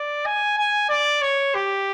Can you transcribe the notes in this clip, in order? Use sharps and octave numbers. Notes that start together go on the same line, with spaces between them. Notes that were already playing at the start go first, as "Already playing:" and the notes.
Already playing: D5
G#5
G#5
D5
C#5
G4